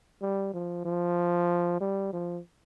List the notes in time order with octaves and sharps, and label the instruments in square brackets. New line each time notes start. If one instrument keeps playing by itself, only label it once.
[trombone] G3
F3
F3
G3
F3